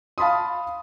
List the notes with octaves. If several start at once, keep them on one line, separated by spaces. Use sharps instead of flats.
F5 A5 B5 C6 D#6